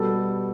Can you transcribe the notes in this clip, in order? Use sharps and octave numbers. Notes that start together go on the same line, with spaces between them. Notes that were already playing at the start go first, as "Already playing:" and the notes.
Already playing: B2 G3 A4